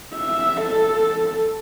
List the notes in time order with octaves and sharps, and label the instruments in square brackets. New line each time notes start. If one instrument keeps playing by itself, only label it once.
[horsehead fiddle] E5
A4